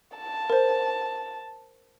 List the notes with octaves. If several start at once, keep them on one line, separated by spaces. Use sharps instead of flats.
A5
A#4 C5